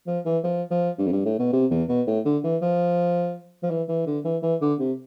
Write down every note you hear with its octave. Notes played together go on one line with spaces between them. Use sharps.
F3
E3
F3
F3
G2
F2
G2
A2
B2
C3
E2
B2
A2
D3
E3
F3
F3
E3
E3
D3
E3
E3
D3
C3